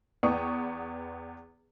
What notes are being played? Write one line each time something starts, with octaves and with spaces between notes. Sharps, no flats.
E2 B3 G5 C#6 D#6